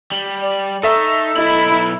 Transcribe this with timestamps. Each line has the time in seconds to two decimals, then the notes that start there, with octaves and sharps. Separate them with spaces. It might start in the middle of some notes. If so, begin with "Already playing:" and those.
0.12 G3
0.42 D5
0.83 D#4 A4 E5 C#6 E6
1.36 B1 E4 D#5 B5